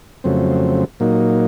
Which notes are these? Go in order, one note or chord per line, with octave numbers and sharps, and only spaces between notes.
F2 C#3 F#3 A3 C4
A#2 F#3 A#3 D#4